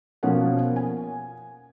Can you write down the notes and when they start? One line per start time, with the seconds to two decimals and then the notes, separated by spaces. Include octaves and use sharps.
0.23 B2 F3 A#3 C#4 F#5
0.76 G#5